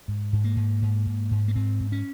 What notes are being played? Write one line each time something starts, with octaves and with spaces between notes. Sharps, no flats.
G#2
G#2
A#3
G#2
G#2
G#2
G#2
A#3
G#2 C4
G#2
C#4